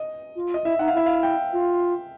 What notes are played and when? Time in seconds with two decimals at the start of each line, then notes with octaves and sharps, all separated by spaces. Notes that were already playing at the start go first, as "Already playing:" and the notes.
Already playing: D#5
0.36 F4
0.54 D#5
0.64 E4 E5
0.79 D#4 F#5
0.88 F5
0.94 E4 E5
1.06 F5
1.23 G5
1.53 F4